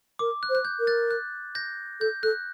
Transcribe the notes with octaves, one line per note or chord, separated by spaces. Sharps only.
A#4 D6
F#6
C5
F#6
G6
A#4
F#6 A6
F#6
G6 A#6
A4 G6
A4 F#6